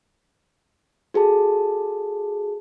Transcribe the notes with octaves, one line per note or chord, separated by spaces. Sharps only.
F#4 G#4 A4 A5